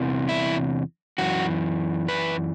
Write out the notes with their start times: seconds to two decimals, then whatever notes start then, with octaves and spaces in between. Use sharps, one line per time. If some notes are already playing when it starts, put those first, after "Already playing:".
Already playing: E2 C3 E3
0.29 E4
1.18 F#2 E3 F#4
2.08 B4